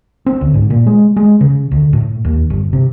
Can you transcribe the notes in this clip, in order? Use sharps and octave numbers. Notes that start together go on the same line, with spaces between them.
C4
D2
G#2
A#2
G#3
G#3
C#3
D2
A2
D#2
G1
C3